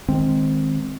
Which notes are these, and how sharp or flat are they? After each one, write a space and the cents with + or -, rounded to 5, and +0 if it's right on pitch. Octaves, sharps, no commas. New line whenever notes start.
D#3 +0 G#3 +0 C4 +0